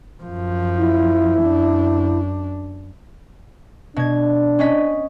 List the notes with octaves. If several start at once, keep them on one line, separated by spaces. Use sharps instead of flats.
F#2 F3
E4
F#2 D4
B2 D4 G#6
C#4 D#5 B6